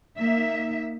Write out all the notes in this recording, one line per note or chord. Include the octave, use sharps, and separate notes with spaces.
A#3 D#4 E5